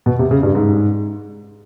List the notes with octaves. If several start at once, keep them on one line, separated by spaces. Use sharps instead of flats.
B2
C3
C#3
G2
G#2